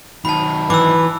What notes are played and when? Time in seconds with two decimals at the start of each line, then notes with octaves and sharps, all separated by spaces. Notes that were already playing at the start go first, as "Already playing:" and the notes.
0.25 D#3 F#3 A5 B5
0.70 E3 B4 D6 E6